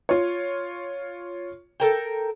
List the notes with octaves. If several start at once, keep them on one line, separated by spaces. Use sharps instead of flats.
F4 C#5
A4 A#4 G5